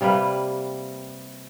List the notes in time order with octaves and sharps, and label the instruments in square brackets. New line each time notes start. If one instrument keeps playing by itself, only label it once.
[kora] C3 G3 A#3 B4